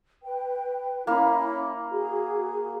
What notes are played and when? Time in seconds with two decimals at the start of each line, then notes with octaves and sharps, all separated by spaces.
0.23 B4 G5
1.07 A#3 C#4 E4 B5
1.91 F#4 G#4